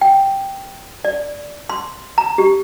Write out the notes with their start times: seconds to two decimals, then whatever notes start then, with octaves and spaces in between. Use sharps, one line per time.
0.01 G5
1.05 D5
1.70 C6
2.18 A#5
2.38 G4